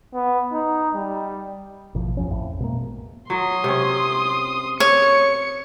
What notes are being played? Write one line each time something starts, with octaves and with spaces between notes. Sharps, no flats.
B3
D#4
G3
A1 B2 F3
F2 F3 C#4
A#1 F2 A2
B2 G#3 A#3
F#3 C6 D#6
C3 C#4
C#5 C#7